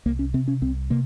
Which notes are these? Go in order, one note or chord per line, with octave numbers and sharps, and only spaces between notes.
C2 A#3
C#4
C3 C4
C#4
C2 C4
C3 A#3